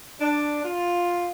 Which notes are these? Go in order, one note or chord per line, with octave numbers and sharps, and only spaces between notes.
D4
F4